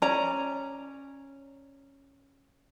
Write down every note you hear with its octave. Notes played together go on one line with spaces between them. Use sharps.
C#4 D5 A#5